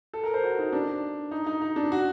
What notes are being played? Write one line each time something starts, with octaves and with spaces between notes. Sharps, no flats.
A4
A#4
C5
F#4
D#4
D4
D#4
D#4
D#4
D4
F#4